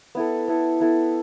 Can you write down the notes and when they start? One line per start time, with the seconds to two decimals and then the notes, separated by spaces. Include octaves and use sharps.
0.15 B3 E4 A4
0.48 B3 E4 A4
0.80 B3 E4 A4